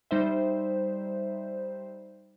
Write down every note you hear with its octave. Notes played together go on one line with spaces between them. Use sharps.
G3 D#4 C5 E5